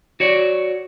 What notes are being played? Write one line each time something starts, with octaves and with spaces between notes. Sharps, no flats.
F#4 C#5 D5